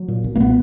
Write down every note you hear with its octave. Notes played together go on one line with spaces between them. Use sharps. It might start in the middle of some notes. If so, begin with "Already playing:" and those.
Already playing: F#3
A#2
B1
A#3
A#2 B3